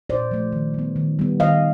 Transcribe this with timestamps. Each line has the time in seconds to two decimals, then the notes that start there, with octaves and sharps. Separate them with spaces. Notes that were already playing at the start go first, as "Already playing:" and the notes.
0.09 A#2 C5 D5
0.31 F3 A3
0.52 D#3
0.74 G3 B3
0.96 D#3
1.19 G3 B3
1.40 D#3 D#5 F5